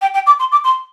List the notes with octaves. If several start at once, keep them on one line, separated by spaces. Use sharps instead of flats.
G5
G5
D6
C6
D6
C6